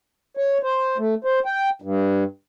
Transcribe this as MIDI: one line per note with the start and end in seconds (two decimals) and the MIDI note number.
0.37 0.58 73
0.63 0.97 72
0.98 1.15 57
1.24 1.39 72
1.46 1.70 79
1.82 2.24 43